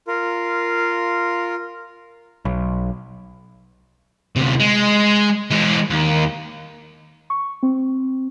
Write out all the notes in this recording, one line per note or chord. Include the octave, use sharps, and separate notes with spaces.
F4 A#4
B1
D2 C3
G#3
E3 G#3
D#2
C#6
C4